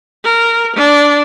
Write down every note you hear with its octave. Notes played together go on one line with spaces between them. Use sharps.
A#4
D4